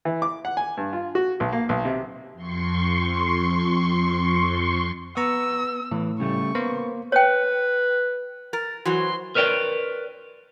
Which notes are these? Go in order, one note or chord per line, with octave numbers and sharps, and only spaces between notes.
E3
D6
F#5
G#5
G2
F4
F#4
B1
A#3
B1
C3
F2 C6 C#6
B3 A#5 C#6 E6
A2 E3
C#3 G3 A3 C#6
A#3 B3 C5
B4 C#5 G5
A#4 A6
E3 F#3 F#4 C5 C6
A#4 B4 C#5 D5 G5